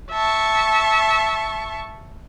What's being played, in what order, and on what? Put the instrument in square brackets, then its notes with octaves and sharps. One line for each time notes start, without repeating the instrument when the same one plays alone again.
[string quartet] E5 A5 C#6